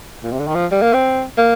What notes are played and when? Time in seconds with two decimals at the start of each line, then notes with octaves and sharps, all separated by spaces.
0.23 A#2
0.32 C3
0.40 D3
0.47 D#3
0.55 F3
0.71 G3
0.82 A#3
0.93 C4
1.37 A#3